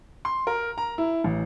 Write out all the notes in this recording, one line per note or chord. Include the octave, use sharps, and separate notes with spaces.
C6
A#4
A#5
E4
A1